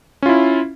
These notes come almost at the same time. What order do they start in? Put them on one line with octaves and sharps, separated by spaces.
C#4 F4 E4